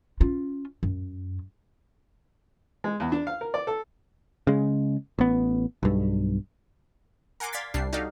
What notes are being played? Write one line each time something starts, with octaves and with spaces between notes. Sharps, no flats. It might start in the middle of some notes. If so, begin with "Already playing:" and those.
C#4 F4
F#2
G#3
E2
D4
F5
A#4
D5
A4
C#3 G#3
A1 B3
B1 G2
A#4 F#5 G#5 C6 D6
D5 F5 C6 G#6 A6 B6
C2 G3 D4 C7
D#4 F#4 G4 A4 D5 F5